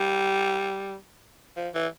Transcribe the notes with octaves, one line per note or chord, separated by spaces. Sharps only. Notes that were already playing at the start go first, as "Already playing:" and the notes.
Already playing: G3
F3
E3